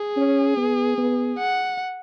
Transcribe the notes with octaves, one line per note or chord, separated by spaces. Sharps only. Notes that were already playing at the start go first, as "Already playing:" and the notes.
Already playing: G#4
C#4
B3
B3
F#5